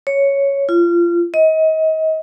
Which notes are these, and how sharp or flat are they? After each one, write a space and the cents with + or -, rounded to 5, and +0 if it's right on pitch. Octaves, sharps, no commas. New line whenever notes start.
C#5 +0
F4 -25
D#5 +30